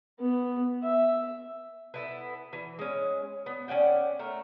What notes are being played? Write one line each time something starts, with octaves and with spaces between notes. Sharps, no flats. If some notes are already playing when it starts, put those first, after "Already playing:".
B3
E5
B3 E4 A4
E3
G#3 C#4
B3
C#4 D5 F#5 G5
A3 A#4